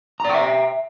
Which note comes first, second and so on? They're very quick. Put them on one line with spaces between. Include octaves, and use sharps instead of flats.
A#5 D5 G5 E5